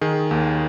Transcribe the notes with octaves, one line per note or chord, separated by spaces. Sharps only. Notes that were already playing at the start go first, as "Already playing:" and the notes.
D#3 G#4
D#2